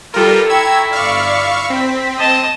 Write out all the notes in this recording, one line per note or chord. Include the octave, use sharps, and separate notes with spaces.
G3 F4 A4 A#4
E4 G5 A#5 C#6 E6 G#6
G1 D5 F5 C#6
C4 B6
D#5 A5